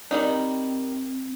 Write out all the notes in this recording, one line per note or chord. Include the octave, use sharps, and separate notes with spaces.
D#3 G3 C4 D#4